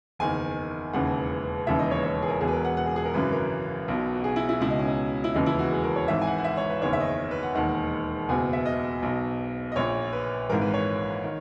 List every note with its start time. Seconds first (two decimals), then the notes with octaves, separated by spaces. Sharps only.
0.19 F#1 E2 D#3 G#5
0.93 E1 D#2 C#3 E3 F#5
1.67 E1 D#2 C#3 E3 E5
1.79 D#5
1.91 C#5
2.03 C#5
2.22 G#4
2.28 A#4
2.41 E1 E2 B2 G#4
2.48 B4
2.53 A#4
2.65 F#5
2.77 F#5
2.86 G#4
2.96 G#4
3.05 A#4
3.14 G#1 F#2 C#3 E3 B4
3.32 A#4
3.88 B1 B2
4.15 F#4
4.24 G#4
4.36 E4
4.49 E4
4.61 C#2 B2 E4
4.70 D#4
4.79 C#4
4.88 D#4
5.24 E4
5.34 E1 D#2 C#3 E3 D#4
5.46 E4
5.59 F#4
5.72 G#4
5.83 A#4
5.96 C#5
6.08 G#1 G#2 E3 E5
6.22 G#5
6.27 F#5
6.38 F#5
6.44 E5
6.57 C#5
6.69 B4
6.81 F#1 E2 D#3 C#5
6.93 E5
7.00 D#5
7.31 B4
7.43 F#5
7.55 E1 D#2 D#3 F#5
8.29 F#1 E2 B2 G#5
8.53 E5
8.66 D#5
9.03 B1 B2
9.72 D#5
9.76 A#1 A#2 C#5
10.13 B4
10.49 G#1 G#2 E3 A#4
10.61 B4
10.74 C#5
11.25 D#3